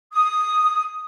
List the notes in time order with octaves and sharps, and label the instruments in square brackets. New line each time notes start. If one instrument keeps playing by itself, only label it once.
[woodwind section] D#6